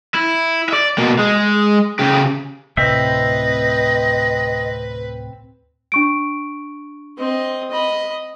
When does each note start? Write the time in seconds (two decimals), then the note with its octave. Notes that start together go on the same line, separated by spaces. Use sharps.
0.15 E4
0.69 D5 E5
0.98 B2 A#3
1.19 G#3
1.99 C#3 G4
2.77 D2 A2 C3 C4 B4 D#5 E5
5.92 D4 C#6 D7
7.18 C4 D#5
7.71 D#5 B5